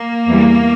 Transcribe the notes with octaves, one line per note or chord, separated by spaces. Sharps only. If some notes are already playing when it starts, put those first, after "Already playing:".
Already playing: A#3
E2 E3 G3